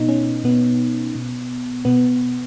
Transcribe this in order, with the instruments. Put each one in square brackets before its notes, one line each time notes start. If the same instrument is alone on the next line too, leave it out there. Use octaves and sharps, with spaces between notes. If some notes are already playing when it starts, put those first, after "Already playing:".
Already playing: [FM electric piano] B2 B3 D#4
C#4
B2 B3
B2
B2 B3